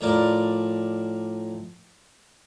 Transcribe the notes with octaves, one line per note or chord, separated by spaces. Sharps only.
A2 F3 A#4 D5